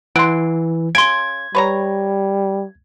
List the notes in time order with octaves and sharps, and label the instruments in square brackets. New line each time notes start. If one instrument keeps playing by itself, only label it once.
[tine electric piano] E3 [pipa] F#5 C6 [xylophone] D7
[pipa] C#3 [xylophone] C6 D7 [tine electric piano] G#6
[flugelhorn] G3 [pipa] B4 C#5 A#5